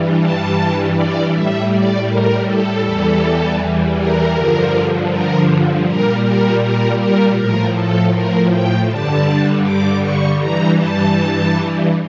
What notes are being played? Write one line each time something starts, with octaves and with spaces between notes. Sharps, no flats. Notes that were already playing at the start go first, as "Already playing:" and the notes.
Already playing: G2 E3 G3
A5
D5
A2 G3 E5
D5
A#4
A4
E2 E3 G3
A#4
G2 D3 F3
A#4
A#2 G3 A#4
A#4
A#4
A#4
A2 F3 A#4
A4
A#4
G5
G2 D3 G3 A5
D6
C#6
G2 E3 G3 A#5
A5